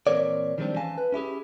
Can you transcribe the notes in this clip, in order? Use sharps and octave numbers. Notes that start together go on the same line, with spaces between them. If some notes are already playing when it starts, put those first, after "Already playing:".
A#2 E3 C4 A#4 C#5 D5
D#3 F3 G3 G#3 C4 D4
E3 C#4 F5 G#5 A5
B4
C#4 E4 G4 G#4